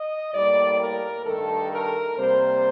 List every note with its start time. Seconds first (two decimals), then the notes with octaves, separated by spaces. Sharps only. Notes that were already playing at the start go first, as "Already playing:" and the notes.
Already playing: D#5
0.34 A2 G3 A#3 D5
0.80 A#4
1.26 G2 D#3 A3 A4
1.72 A#4
2.17 C3 G3 A#3 C5